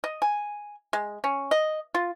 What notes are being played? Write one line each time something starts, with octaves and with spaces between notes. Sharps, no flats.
D#5
G#5
G#3
C#4
D#5
F4